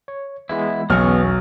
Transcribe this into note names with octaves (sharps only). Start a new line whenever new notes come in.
C#5
E3 G#3 B3 E4
B1 E2 F#3 B3 C#4 C#6 F6